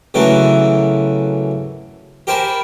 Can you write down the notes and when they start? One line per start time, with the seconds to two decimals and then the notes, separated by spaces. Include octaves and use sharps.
0.14 C#3 E3 F#3 A3 A#4
2.27 G4 A#4 C5 G#5 A5 B5